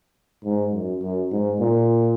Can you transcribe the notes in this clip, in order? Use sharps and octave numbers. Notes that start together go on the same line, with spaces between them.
G#2
F#2
F#2
G#2
A#2